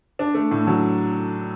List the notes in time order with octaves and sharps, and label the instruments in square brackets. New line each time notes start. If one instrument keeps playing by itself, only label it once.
[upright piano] D4
A3
A2
F#3